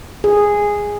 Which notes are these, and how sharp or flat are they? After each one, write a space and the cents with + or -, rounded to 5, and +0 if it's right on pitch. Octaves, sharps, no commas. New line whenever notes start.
G#4 -10